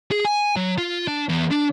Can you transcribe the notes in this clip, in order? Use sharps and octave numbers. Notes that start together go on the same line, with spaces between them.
G#4
G#5
F#3
F4
D4
E2
D4